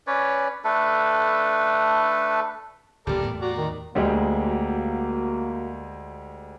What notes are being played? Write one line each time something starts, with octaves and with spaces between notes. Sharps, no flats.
C#4 B4 C#5 D5
A3 D4 A4 B4
C#2 A#2 D3 G3 A4 A#4 D5
E2 A2 B3
F#4 D5 A#5
D#3
D2 G3 G#3 A#3 F#4